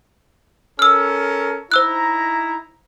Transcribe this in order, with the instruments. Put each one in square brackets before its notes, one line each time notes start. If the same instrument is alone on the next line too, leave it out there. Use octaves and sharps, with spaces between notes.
[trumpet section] C#4 A4 A#4 [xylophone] E6 F6
[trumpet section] D#4 E4 A#5 [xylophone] C5 E6 F#6